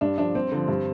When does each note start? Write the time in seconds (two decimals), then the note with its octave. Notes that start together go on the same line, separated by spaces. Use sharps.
0.01 G2 D4
0.18 F3 D4
0.35 G2 C4
0.52 D3 F3
0.68 G2